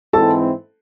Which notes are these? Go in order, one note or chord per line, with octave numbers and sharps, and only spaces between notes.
G#2 E3 C4 E4 A4 A5